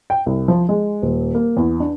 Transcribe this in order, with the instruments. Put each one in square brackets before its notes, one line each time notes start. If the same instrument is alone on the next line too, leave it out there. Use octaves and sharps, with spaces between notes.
[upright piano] G5
C2
F3
G#3
D#1
A#3
E2
D4